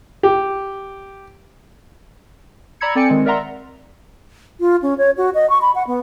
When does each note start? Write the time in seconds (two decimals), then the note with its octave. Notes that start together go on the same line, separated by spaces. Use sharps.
0.23 G4
2.81 D5 A#5 B5 E6 G#6 C#7
2.95 C4 A4 D5 G5 G#5 C#7
3.09 D#3 G#3 C4
3.26 A#4 D5 E5 F#5 A#5 C6
4.60 F4
4.82 C#4
4.98 C#5
5.17 F#4
5.35 D#5
5.50 C#6
5.62 B5
5.75 F#5
5.87 B3